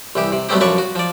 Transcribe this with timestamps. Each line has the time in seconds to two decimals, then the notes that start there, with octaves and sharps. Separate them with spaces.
0.15 C2 E3 G4
0.32 C3
0.49 F#3 G3 A3 B3 C4 G4
0.60 F#2 F3 B4 C#5 D5 C#6
0.78 F#4
0.95 F3 D5